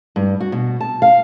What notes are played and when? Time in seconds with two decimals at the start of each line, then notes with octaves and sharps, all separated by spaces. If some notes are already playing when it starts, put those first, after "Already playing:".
0.16 G2
0.40 F#4
0.52 B2
0.80 A5
1.02 F5